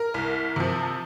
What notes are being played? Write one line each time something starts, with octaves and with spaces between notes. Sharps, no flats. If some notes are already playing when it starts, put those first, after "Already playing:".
Already playing: A#4
C2
C3 F3